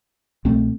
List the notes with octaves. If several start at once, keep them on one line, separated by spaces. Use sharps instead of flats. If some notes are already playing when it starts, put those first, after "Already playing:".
C2 B2 A3 C4